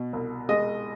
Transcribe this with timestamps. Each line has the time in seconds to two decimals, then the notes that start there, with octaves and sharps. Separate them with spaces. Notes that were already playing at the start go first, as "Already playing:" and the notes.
Already playing: B2
0.13 C2
0.49 G#3 D#5